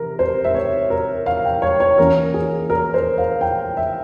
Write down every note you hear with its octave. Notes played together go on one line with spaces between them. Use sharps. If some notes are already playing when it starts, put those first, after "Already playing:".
Already playing: C3 E3 A#4
C5
E5
C#5
A#4
F5
G5
C#5
C#5
E3 A#3 C#4 A#4
G#4
A#4
C5
F5
G5
E5